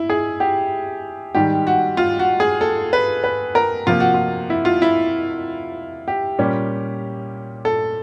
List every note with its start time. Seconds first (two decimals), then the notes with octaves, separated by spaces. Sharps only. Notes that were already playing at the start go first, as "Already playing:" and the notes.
Already playing: E4
0.10 G#4
0.40 G4
1.35 G#2 D#3 G3 G4
1.67 F#4
1.97 F4
2.19 F#4
2.40 G#4
2.61 A4
2.93 B4
3.24 B4
3.55 A#4
3.87 C3 F3 A#3 F4
4.00 F#4
4.14 F4
4.50 E4
4.65 F4
4.82 E4
6.08 G4
6.38 A#2 G3 A#3 C#4
7.65 A4